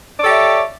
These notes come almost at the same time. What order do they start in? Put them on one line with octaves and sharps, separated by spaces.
D5 C#5 A4 G4 E5